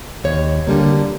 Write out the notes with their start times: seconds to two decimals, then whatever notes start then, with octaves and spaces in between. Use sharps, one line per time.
0.24 D#2 C#5
0.67 D3 G3 A#3